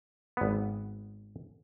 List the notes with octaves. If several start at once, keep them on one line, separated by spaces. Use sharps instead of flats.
G#1 B3